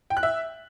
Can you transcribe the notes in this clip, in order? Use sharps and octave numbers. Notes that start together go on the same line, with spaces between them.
G5
F#6
E5